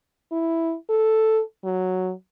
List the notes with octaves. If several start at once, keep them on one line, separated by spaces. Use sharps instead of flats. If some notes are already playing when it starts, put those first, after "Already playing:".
E4
A4
F#3